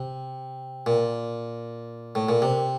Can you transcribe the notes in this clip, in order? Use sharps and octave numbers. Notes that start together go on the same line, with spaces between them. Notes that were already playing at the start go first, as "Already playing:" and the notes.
Already playing: C3
A#2
A2
A#2
C3